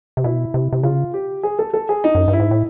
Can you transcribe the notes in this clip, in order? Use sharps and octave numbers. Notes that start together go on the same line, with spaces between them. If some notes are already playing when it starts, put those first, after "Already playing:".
C3
B2 E4
C3
C3
C#3 F4
G4
G#4
A4
A4
G#4
D#4
F#2
G2
E4
G#2
A2